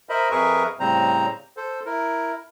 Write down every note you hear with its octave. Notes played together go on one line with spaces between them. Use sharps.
A#4 C5 D#5 E5 B5
F2 G#4 A#4 B4 E5 C#6
A2 C#3 G3 C4 C5 A#5
A4 C5
E4 A#4